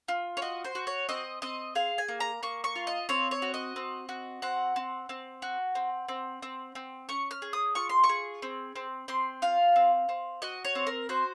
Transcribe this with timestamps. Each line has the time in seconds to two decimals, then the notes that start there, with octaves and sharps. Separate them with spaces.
0.08 F4
0.37 C#5
0.42 F#4 D#5
0.64 C5
0.75 F#4
0.87 C#5
1.09 C4 D#5
1.42 C4 D#5
1.75 G#4 F5
1.98 G#5
2.08 A#3
2.20 A#5
2.43 A#3 C#6
2.64 C#6
2.76 F4
2.87 D#5
3.09 C4 C#5
3.31 C#5
3.42 F#4
3.54 D#5
3.76 C4
4.09 F#4
4.42 C4 F#5
4.76 C4
5.09 C4
5.42 F#4
5.75 C4
6.09 C4
6.42 C4
6.75 C4
7.09 C#4 C#6
7.31 F6
7.42 G#4
7.53 D#6
7.75 F4 C#6
7.89 C6
8.04 C#6
8.09 G#4
8.42 C4
8.76 C4
9.08 C4 C6
9.42 F4 F5
9.76 C4
10.09 C4
10.42 F#4 D#5
10.65 C#5
10.75 C4
10.87 A#4
11.09 F#4 C5